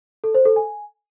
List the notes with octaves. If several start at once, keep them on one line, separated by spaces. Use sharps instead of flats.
A4
C5
A4
G#5